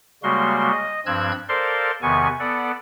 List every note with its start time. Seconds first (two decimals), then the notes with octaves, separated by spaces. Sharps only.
0.23 C#3 G3 G#3 A#3 F#4 C6
0.72 D#5
1.06 G2 F3 C4 E6 F#6 G#6
1.49 A4 A#4 C5 D5 F5 C6
2.02 E2 C3 D#3 B3 G#5 C#6
2.40 B3 A4 D5 F#5